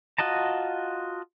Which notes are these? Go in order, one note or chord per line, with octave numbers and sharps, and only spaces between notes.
F4 F#4 D#5 A5 A#5